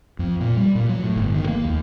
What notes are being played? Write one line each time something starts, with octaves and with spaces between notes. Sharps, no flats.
F2
A#2
G3
A#2
F#3
A2
G1
D#3
A#3
D#2